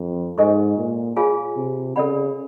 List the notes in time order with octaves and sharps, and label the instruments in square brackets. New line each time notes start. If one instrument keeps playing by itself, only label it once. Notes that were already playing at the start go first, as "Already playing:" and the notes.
Already playing: [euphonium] F2
[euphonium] G#2 [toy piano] A4 C5 D#5 G#5 C#6
[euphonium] A#2
[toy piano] F4 G#4 C#5 F5 G#5
[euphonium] C3
[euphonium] C#3 [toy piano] A4 D5 F#5 B5